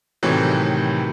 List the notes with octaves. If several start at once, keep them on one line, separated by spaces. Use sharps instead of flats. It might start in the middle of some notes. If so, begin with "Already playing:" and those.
A2 C3 D#3 E3 F#3